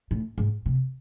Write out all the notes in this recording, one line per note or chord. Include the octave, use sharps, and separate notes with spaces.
A2
G#2
C3